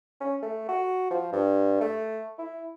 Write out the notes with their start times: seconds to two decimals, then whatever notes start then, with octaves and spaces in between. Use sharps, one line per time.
0.21 C#4
0.42 A3
0.69 F#4
1.11 F3
1.32 G2
1.81 A3
2.38 E4